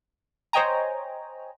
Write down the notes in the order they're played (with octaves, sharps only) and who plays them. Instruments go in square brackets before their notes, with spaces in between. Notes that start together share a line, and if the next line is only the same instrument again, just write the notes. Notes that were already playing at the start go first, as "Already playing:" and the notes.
[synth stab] C5 C#5 D#5 G5 G#5 A#5